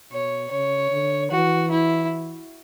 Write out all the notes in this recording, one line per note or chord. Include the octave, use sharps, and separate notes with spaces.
B2 C#5
C#3 C#5
D3
E3 F#4
E4